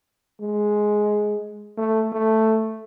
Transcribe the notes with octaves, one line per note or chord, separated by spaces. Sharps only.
G#3
A3
A3